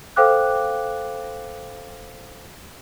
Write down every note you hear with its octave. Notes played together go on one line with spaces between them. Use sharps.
A4 C5 F5 G5 D6 F#6